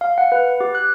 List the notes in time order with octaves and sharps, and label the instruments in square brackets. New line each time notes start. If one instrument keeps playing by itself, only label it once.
[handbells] F5
F#5
B4
G4
F#6